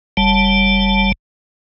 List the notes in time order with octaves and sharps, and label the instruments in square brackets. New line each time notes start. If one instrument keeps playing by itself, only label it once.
[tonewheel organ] F#1 G3 A5